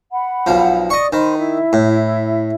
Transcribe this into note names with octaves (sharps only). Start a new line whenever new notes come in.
F#5 B5
B1 F3
D5 D#5 C#6 D#6
D#3 C5 B5
E4 E5
A2